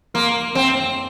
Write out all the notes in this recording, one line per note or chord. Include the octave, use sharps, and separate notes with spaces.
A#3 C6 F6
C4 G5 C6